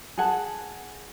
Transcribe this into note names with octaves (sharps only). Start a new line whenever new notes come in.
G#4 F#5 A5